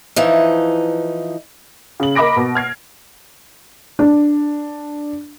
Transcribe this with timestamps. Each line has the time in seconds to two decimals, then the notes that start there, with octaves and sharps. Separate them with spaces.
0.16 E3 F3 D#4
2.00 C#3 F#7
2.15 A#4 D#5 B5 D6 A#6 D7
2.37 B2
2.55 F6 G#6 C7
3.99 D4